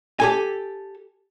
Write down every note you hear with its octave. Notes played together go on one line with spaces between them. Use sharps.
G4 A4 G#5